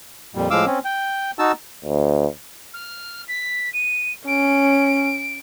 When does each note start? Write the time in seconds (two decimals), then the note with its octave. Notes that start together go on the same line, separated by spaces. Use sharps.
0.35 F2 A#2 G3
0.51 A2 F3 G#3 F5 D6 E6
0.66 C4 C#4
0.85 G5
1.39 D#4 F#4 A5 E6
1.85 D2
2.74 F6
3.28 B6
3.73 D#7
4.27 C#4 D7